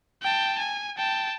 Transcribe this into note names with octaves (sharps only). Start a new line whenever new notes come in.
G5 A5
G#5
G5 A5